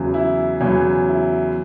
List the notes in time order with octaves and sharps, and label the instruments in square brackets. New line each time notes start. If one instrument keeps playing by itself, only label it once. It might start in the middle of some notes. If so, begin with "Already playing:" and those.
Already playing: [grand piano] E2 C#3 F#3
E4
E2 C#3 F#3 C#4
E4